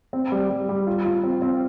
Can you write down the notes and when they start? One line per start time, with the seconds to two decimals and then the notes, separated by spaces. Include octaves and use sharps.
0.13 C4
0.32 G3
0.50 G3
0.69 G3
0.87 F4
1.05 F4
1.23 C4
1.42 C4